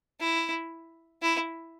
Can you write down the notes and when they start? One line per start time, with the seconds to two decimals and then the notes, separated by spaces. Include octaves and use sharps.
0.20 E4
1.22 E4